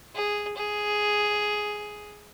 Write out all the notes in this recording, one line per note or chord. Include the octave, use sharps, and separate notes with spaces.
G#4
G#4